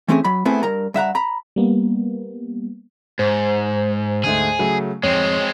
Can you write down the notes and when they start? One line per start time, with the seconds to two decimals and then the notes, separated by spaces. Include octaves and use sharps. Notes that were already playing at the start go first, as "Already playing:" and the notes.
0.08 E3 A3 C4 C#4 E4 G#4
0.24 F#3 B5
0.45 A3 B3 C4 E4 G#4 C5
0.63 G2 A#4 A#5
0.94 G2 E5 F#5 A#5
1.15 A#5 B5
1.56 G3 A#3 B3
3.19 G#2 C5
4.24 D2 G#2 A3 G#4
4.59 C#3 F#3 A3
5.03 F2 G#3 C4 C#5